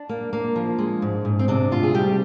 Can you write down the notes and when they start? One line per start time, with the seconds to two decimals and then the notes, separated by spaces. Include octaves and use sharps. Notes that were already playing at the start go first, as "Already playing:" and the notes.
Already playing: D4
0.09 A#3
0.33 A#3
0.56 F3
0.79 G#3
1.02 G#2
1.25 G#2
1.39 C4
1.48 C3 D4
1.72 D2 F4
1.83 G#4
1.94 G3 G4